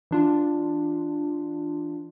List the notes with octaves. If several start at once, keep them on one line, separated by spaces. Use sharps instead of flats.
E3 D4 F4